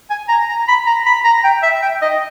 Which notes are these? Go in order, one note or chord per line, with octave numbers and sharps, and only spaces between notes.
G#5
A#5
A#5
B5
A#5
B5
A#5
G5
E5
G5
D#5